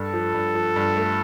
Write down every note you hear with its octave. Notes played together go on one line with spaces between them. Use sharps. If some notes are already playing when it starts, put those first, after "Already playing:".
Already playing: G2 A4
F3
G2
F3
G2
A3